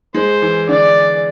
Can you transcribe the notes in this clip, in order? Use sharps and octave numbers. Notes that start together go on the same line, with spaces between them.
G#3 C5
E3
D3 D5